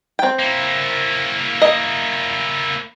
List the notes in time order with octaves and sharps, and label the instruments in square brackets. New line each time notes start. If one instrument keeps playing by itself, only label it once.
[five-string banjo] C4 G5
[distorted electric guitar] A#3 E4
[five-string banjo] D#5